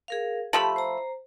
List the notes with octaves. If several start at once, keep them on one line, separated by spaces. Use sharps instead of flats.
G#4 A#4 F5
F3 A3 G4 B5
C5 A#5